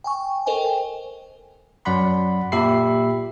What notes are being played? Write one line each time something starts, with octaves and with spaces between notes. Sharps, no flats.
G5 G#5 C#6
A4 A#4 C5 D#5 G5 G#5
F#2 F#3 D5 F#5 B5 C6
A#2 G4 E5 B5 C7